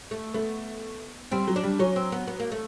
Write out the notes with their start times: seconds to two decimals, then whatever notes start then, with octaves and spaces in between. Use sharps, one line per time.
0.11 A3
0.34 A3 B3
1.31 G3 C4
1.48 F#3
1.56 D4
1.64 G3
1.79 F#3 C#4
1.96 C4
2.12 B3
2.27 B3
2.40 A#3
2.52 A3